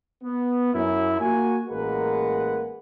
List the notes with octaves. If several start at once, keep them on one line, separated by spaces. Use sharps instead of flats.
B3
F#2 E4
A#3 F#4 G#5
A1 G#3 A#3 A#4 B4 F#5